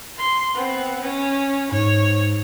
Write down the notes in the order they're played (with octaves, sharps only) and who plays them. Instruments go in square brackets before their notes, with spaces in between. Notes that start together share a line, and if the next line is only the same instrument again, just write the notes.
[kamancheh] C6
B3 C4
C#4
[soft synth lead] G#2 [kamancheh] C#5